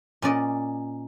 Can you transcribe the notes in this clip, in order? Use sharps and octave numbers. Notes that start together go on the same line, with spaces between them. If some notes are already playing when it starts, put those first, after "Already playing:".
A#2 C#4 D5 D#5